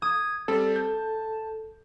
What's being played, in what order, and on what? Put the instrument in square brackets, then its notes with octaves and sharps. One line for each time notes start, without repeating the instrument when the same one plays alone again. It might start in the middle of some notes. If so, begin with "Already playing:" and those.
[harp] D#6 [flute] G#6
[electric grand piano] G3 C4 [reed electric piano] A4 [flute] D5
[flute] A5 [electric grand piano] G6